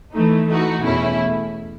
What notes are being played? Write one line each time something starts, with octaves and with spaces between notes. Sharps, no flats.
E3 A3 D#4
E3 A3 D#4 F#4
E2 B2 A3 C#4 E4